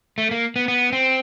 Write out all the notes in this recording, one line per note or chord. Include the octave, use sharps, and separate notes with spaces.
A3
A#3
B3
B3
C4